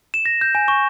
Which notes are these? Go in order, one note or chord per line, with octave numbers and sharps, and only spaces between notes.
E7
A#6
G6
G#5
C#6